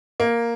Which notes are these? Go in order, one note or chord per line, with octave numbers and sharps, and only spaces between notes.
A#3